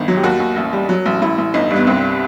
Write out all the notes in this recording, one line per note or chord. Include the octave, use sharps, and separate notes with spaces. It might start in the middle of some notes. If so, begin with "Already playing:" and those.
Already playing: G1 D#3
F#3
G4
D#2 F#4
D#2
A1
G3
F#3
A1
A1 E4
A1
G1 D#4
G2
B3
C2 C4